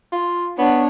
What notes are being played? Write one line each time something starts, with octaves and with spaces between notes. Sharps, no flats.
F4
B3 D4 C#5